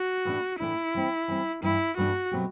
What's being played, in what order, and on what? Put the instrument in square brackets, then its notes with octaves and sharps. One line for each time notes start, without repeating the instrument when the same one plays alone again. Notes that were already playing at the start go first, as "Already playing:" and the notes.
Already playing: [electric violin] F#4
[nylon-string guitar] A2 E3 A3 D4
[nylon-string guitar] A2 E3 A3 D4 [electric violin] E4
[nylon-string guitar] E3 G3 C4
E3 G3 C4
[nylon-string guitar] G2 E3 A3 D4 [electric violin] E4
[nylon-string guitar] G2 E3 A3 D4 [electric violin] F#4
[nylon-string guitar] B2 F#3 A3 C4 G4